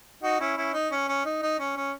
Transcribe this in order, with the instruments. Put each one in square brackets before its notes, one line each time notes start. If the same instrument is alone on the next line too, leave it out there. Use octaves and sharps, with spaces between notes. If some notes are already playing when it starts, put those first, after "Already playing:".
[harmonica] D#4 F#4
C#4 E4
C#4 E4
D#4
C#4
C#4
D#4
D#4
C#4
C#4